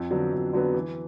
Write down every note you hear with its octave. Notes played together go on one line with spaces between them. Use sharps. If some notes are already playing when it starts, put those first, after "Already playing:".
Already playing: F2
D3 F#3 B3
F2
D3 F#3 B3
E3